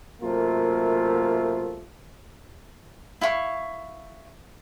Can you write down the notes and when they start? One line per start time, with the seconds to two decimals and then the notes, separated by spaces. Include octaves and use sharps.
0.21 F#2 C3 A3 A#3 F4
3.21 E4 F5 C#6